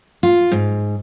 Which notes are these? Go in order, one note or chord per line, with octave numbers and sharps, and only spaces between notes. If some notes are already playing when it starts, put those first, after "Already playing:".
F4
G#2